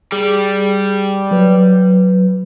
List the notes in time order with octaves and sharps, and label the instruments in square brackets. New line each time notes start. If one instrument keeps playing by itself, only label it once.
[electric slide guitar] G3 [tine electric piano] G#4
[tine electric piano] F#3 B4